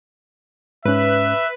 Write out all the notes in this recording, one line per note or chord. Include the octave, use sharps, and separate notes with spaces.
G#2 C#4 B4 E5